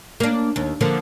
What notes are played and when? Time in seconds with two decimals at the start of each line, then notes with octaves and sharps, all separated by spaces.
0.20 A#3 D4
0.56 D#2
0.81 D3 F3 A#3